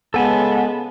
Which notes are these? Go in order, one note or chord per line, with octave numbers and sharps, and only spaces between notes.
C#3 G#3 B3 A4 G#5 A5